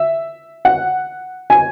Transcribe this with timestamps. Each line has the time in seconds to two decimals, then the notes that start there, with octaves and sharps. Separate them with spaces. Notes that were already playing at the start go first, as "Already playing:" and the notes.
Already playing: E5
0.65 F#5
1.50 G#5